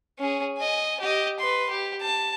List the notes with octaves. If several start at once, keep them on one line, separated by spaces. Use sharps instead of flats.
C#4 G#4
D#5 G#5
G4 D#5
B4 C6
G4
A5